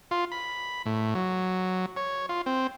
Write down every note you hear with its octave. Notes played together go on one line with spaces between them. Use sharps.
F4
B5
A2
F#3
C#5
F4
C4